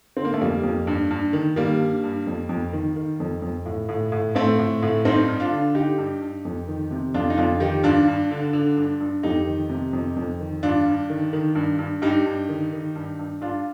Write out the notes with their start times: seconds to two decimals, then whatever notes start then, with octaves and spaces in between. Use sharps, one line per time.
0.17 D3 C4
0.25 A#3
0.34 A3
0.41 F2 G3 A#3
0.63 F2
0.87 G2
1.11 G2
1.33 D#3
1.56 D#3 G3 A#3
1.80 G2
2.04 G2
2.27 F2
2.49 F2
2.73 D#3
2.96 D#3
3.20 F2
3.42 F2
3.66 A2
3.89 A2
4.12 A2
4.35 A2 A3 C4
4.59 A2
4.83 A2
5.05 G2 C4 D#4
5.28 G2
5.40 D4 F4
5.51 D3
5.75 D3 D#4 G4
5.98 G2
6.22 G2
6.45 F2
6.68 D#3
6.91 C3
7.14 F2 D4 F4
7.30 D#4
7.37 F2 D4 F4
7.60 D#3 D#4 G4
7.83 G2 D4 F4
8.08 G2
8.31 D3
8.53 D3
8.77 G2
9.00 G2
9.23 F2 D#4 G4
9.47 D#3
9.69 C3
9.93 F2
10.16 F2
10.40 D#3
10.63 G2 D4 F4
10.86 G2
11.10 D#3
11.33 D#3
11.55 G2
11.79 G2
12.02 G2 D#4 G4
12.26 G2
12.49 D#3
12.73 D#3
12.95 G2
13.19 G2
13.41 G2 D4 F4